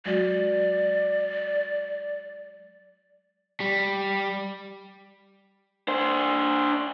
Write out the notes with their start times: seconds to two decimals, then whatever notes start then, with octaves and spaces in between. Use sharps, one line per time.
0.06 F#3 G#3 F#4 D5
3.60 G3
5.88 D4 C5